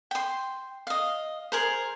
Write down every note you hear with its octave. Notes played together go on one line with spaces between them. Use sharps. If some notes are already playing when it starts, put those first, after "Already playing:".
G5 C6
D#5 F5
G#4 A#4 C5